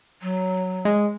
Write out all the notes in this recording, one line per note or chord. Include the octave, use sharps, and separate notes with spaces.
F#3
G#3